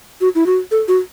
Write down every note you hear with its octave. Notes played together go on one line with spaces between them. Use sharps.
F#4
E4
F#4
A4
F#4